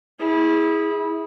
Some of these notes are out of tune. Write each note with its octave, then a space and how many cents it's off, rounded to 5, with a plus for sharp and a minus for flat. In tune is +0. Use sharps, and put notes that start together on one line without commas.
E4 -25 G#4 -5